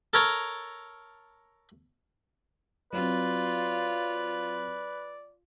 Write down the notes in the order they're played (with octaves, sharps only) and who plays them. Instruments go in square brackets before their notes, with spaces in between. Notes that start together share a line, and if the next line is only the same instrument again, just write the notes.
[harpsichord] A4 A#4 C#5 A#5
[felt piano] F#3 C4 [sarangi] F4 [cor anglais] B4 [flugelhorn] D5